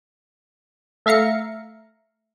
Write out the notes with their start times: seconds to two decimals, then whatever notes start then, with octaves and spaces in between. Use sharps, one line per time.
1.06 A3 E5 F5 A#5 C#7